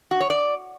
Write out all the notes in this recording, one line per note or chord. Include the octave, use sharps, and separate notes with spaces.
F#4
C#5
D5